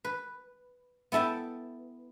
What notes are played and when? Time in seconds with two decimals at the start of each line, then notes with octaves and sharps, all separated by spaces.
0.04 B4
1.12 B3 E4 A4 E5 G5